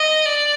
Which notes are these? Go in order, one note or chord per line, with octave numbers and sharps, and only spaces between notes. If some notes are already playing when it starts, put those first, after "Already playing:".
Already playing: D#5
D5